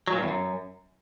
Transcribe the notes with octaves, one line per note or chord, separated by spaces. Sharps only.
F#3
A#2
G2
E2
F#2